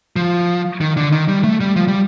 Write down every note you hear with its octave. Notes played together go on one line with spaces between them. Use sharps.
F3
D#3
D3
D#3
G3
A3
G3
F3
G3